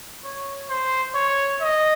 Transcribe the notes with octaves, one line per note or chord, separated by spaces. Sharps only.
C#5
C5
C#5
D#5